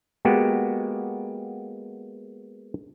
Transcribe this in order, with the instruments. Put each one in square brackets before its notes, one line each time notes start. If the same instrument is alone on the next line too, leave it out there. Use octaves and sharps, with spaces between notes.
[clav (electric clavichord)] G#3 A#3 B3 F#4 G4